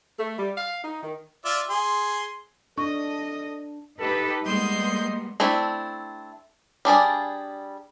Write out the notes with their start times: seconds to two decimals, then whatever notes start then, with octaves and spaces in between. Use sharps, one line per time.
0.19 A3
0.38 G3
0.58 F5
0.84 D#4
1.03 D#3
1.45 F4 D5 E5
1.70 G#4 C6
2.78 D4 A4 D#5 C#6
3.99 D#4 G4 A4 B4
4.45 G3 G#3 A#3 B3 D#5 C6 G6
5.40 A3 C4 D4 E4
6.85 G3 D4 G#4 D5